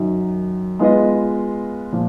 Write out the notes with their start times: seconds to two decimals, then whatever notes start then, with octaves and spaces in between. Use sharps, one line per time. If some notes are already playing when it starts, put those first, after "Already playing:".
Already playing: F#2 D#3 F#3
0.79 G#3 B3 F4 B4 D#5
1.92 A#2 F3